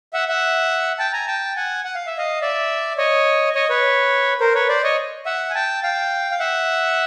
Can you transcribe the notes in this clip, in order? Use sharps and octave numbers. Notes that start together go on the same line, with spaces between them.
E5 F#5
E5 F#5
G5 A5
G#5 A#5
G5 A5
F#5 G#5
F#5
F5
E5
D#5 F5
D5 E5
C#5 D#5
C#5 D#5
B4 C#5
A#4 C5
B4 C#5
C5 D5
C#5 D#5
E5 F#5
G#5
G5 A5
F5 G5
F5
E5 F#5